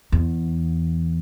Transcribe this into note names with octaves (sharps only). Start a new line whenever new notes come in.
E2